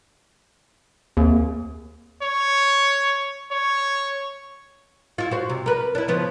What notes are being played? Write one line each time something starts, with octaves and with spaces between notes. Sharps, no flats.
D#2 A#3 C4 G#4
C#5
C#5
E4 F4
F#4 C5
C3
A#4 B4
D4 E4
C#3 F3 B3